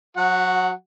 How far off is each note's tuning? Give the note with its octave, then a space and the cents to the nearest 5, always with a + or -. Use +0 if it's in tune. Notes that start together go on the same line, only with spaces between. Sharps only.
F#3 -30 F#4 +0 F#5 +0